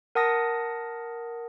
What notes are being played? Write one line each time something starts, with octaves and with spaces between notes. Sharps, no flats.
A#4 F#5 A5 D#6 A#6